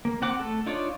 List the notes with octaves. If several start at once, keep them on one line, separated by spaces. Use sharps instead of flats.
A#3
C4 F#5 D6
A3 A4
D4 D#4 F4 C#5 D5